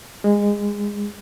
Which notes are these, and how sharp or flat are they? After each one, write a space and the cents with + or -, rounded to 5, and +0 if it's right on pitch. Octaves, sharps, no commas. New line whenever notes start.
G#3 -20